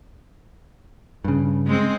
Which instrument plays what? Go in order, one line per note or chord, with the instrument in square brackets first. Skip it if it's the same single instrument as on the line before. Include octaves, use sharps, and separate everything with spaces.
[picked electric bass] G2 C#3
[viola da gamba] G#3 C4